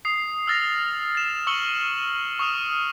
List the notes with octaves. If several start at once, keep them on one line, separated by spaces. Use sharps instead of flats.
D#6 C7
E6 F6 A6 A#6 F7
A6 E7 F7
C#6 E6 F6 C#7 F#7 G7
C#6 D#6 F6 E7